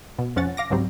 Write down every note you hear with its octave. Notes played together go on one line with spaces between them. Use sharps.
B2
F2 F3 C#4 F#5 A6
F5 D6 A#6
C#2 G#2 F#3 G3 C4